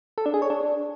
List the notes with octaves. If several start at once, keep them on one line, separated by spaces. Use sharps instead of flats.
A4
D4
G#4
C#5
D4